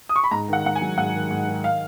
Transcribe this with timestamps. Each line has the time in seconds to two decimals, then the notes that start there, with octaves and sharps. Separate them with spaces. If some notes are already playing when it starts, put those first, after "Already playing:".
0.09 D#6
0.16 C#6
0.24 B5
0.31 G#2 A#5
0.48 D#3 F#5
0.65 G#2 F#5
0.76 G#5
0.81 F#3
0.98 G#2 F#5
1.14 D#3
1.31 G#2
1.47 D#3
1.64 F5